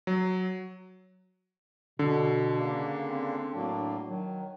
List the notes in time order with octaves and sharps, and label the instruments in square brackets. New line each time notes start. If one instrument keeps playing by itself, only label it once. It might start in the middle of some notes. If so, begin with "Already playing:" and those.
[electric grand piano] F#3
[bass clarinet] B2 [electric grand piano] D3
[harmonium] C#3 A#3 D4
[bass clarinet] C4
[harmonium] A2 F#3 A#3 [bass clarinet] D4
[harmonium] D#3 [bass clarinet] F#3